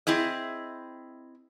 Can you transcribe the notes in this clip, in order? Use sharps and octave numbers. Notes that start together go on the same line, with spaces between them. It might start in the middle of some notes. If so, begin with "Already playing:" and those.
C4 E4 G#4 D#5